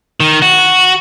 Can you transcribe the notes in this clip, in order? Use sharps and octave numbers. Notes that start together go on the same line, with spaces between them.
D#3
F#4